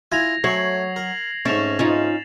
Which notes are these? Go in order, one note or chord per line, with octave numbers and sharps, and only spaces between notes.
E4 F4 G#5 G#6 A#6 F7
F#3 A3 C#4 C#5 C7 F#7
A#4
G#2 A3 C#4 A6 E7 F7
C#4 D#4 F4